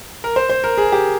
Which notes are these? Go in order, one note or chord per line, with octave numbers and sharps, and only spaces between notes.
A#4
C5
C5
A#4
G#4
G4